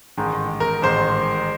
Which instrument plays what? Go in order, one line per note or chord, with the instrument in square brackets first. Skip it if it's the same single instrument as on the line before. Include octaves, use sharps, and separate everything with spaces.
[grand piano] A1 G#2 D#3 G#3
[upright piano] A#4
[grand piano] A1 G#2 D#3 G#3 [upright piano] C5